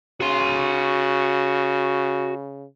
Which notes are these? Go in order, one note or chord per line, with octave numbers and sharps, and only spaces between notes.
C#3 F#4 C6